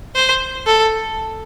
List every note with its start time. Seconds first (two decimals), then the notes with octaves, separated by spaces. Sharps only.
0.15 C5
0.66 A4